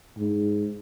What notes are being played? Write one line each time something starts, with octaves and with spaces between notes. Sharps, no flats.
G#2